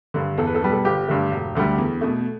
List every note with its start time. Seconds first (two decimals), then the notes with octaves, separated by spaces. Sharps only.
0.14 G2 D3
0.38 E2 A4
0.47 B4
0.55 A4
0.61 B2 G3 B4
0.72 A4
0.85 G1 G4
1.08 G2 D3 A3
1.32 E1
1.55 D2 D3 G3
1.78 E2
2.01 B2 A3